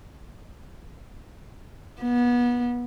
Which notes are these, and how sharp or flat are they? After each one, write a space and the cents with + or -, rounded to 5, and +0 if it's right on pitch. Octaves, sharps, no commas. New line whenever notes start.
B3 -25